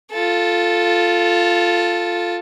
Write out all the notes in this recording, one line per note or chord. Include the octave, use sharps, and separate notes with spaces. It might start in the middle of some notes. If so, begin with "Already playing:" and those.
F4 A4